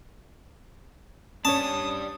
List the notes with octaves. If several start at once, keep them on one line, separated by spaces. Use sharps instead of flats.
G3 C#4 D4 C#5 A5 D#6